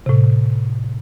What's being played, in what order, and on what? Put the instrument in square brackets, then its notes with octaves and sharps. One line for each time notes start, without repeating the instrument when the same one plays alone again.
[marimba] A2 C3